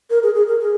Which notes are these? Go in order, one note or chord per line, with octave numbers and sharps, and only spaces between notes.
A#4
G#4
G#4
A#4
G#4